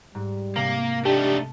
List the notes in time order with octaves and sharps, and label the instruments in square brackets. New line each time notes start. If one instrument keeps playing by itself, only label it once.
[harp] G#2 [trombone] G3
[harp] C3 [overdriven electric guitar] A#3
[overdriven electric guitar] A3 D#4 [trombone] D4 [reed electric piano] G4 [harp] A5